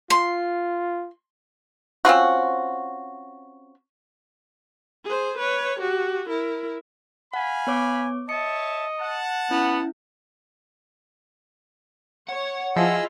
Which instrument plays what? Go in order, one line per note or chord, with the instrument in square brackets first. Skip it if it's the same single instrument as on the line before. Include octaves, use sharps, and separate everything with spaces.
[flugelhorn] F4 [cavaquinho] C6
[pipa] C4 C#4 F4 F#4
[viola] G#4 C5
B4 C#5
F#4 G4
E4 A#4
[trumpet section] F5 G#5 B5 [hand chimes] F#5
[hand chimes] B3 C#5 D6
[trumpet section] C#5 E5 A5 [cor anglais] D#5 [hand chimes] C#7
[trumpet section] F#5 A5
[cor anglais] B3 [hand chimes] C#4 E4
[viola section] C#5 [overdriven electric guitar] F#5
[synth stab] F3 [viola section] E4 F4 [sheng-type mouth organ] G#4 D#5 E6